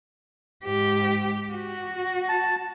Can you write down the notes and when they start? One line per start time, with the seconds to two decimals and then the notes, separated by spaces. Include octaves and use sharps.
0.64 G#2 G4
1.53 F#4
2.29 A5